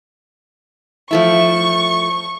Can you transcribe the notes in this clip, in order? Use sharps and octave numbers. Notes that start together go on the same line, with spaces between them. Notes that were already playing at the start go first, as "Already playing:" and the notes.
F3 A3 E4 C#6